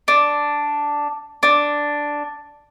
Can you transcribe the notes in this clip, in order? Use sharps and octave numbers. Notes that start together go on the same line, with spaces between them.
D4
D4